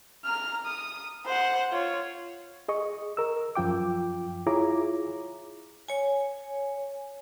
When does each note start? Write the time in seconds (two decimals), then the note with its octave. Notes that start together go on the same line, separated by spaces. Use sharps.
0.25 A#5 F6
0.66 D#6
1.25 C5 F#5
1.71 F4 C#5
2.68 G#4 D#5 C#6
3.17 A#4 E6
3.56 F#2 F3 F4 G5 D6
4.47 E4 F4 G#4 C#5 A#5 D6
5.88 C#5 G#5